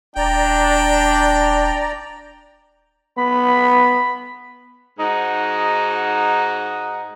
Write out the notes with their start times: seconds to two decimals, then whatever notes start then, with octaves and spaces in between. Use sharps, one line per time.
0.16 D#1 D4 D5 G5 A#5
3.18 B3 B5
4.99 G#2 D#4 F#4